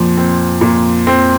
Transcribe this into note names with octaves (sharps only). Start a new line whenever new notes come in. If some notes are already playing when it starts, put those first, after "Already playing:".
Already playing: F2 A#2 F3
C4
A#2
C4